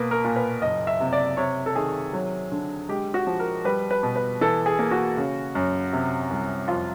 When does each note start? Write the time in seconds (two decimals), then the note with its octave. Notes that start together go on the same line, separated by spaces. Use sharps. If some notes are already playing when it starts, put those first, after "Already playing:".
Already playing: B2 A#3 B4
0.11 A#4
0.24 A#2
0.36 B4
0.62 F#1 D#5
0.87 E5
1.00 C3
1.13 D5
1.37 C3 C#5
1.66 A4
1.75 D#3 G#4
2.13 F#3
2.52 D3
2.89 G#3 G4
3.14 F#4
3.27 F3
3.40 A#4
3.64 G3 B4
3.91 B4
4.03 B2
4.16 B4
4.41 E3 A4
4.66 G#4
4.79 A#3
4.91 F#4
5.17 C#3
5.55 F#2
5.93 C3
6.31 C2
6.68 F2 F4